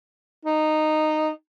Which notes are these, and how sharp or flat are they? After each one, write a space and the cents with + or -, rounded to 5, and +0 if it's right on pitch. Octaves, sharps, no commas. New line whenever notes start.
D#4 -10